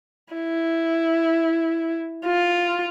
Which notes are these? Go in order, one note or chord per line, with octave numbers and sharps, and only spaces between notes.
E4
F4